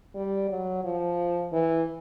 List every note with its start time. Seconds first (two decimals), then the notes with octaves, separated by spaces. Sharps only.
0.15 G3
0.50 F#3
0.84 F3
1.52 E3